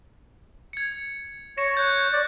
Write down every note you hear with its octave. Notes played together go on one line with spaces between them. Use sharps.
G#6 C#7
C#5 A#6 C#7 E7
F#6 G6 A6
D5